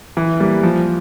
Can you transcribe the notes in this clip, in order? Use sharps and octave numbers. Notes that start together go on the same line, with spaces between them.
E3
G3 A#3
F3